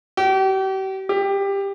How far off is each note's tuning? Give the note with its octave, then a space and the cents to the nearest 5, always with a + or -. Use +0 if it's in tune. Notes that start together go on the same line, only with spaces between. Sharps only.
G4 -40
G4 +15